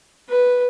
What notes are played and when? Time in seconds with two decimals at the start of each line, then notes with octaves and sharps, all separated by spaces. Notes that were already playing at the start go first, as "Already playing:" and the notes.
0.30 B4